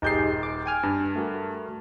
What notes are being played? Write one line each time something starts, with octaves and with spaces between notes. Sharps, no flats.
D#1 D#4 G4 G#4 G6 C7
D6
G5 G#5 F6
G2
A3 F#4 A#4